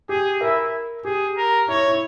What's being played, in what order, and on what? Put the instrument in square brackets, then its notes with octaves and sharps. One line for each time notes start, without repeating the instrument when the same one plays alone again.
[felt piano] G4 [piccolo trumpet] G#4
[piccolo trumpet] E4 [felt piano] A#4
[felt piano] G4 [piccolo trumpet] G#4
[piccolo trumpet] A#4
[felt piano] E4 [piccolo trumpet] C#5
[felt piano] E4